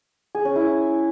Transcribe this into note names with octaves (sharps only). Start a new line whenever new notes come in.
G#4
C#4
E4